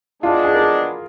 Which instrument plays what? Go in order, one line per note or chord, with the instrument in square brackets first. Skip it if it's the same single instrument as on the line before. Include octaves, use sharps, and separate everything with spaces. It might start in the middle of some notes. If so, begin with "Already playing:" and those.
[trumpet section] G#3 B3 D4 [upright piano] F4
[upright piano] G#4
A#4